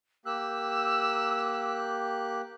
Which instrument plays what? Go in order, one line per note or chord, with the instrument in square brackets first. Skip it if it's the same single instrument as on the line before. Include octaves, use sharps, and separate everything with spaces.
[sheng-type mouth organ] A#3 G4 F#6 [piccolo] E6